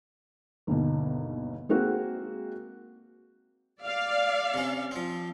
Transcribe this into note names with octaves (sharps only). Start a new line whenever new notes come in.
G1 D#2 B2
G#3 A#3 C4 F#4
D5 F5
C3 C#4
F3 C4